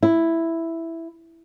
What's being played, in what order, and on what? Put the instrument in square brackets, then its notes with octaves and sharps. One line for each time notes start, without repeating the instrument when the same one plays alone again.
[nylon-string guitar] E4